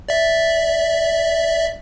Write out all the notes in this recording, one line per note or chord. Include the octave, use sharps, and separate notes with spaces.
D5 E5